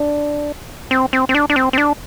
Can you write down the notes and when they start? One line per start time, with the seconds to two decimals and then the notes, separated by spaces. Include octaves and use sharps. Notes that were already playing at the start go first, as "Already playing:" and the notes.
Already playing: D4
0.91 C4
1.13 C4
1.29 C4
1.35 D4
1.50 D4
1.56 C4
1.73 C4
1.78 D4